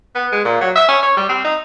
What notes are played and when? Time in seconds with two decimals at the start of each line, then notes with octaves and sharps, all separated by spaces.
0.15 B3
0.32 G#3
0.45 A#2
0.61 F#3
0.75 E5
0.89 C#4
1.03 C#5
1.17 G3
1.29 C4
1.45 D#4